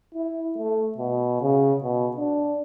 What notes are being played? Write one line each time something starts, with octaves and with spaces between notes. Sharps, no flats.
E4
A3
B2
C#3
B2
D4